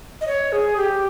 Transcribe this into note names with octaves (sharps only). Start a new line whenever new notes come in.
D#5
C#5
G#4
G4